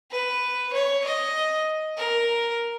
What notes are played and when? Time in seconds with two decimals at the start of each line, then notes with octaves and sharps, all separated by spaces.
0.11 B4
0.73 C#5
1.04 D#5
1.97 A#4